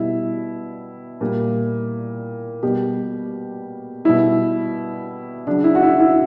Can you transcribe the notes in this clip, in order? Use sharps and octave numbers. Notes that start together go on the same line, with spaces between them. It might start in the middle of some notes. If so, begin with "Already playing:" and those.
Already playing: B2 G3 E4
A#2 G3
B2 G3 G4
B2 G3 E4
C#3 F#3 D4
E4
F#4
E4
E4